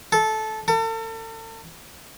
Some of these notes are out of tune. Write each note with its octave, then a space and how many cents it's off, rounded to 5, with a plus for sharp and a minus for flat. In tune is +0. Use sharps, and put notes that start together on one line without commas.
A4 -15
A4 +40